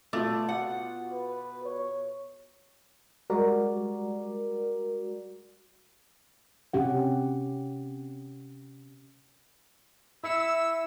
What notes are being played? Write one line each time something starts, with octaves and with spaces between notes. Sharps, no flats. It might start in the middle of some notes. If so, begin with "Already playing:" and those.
B2 A3 F4 D6
F#5
B4
C#5
G3 G#3 F#4 A#4 D5
C3 C#4 G4 F#5
E4 E5 E6 C#7
E6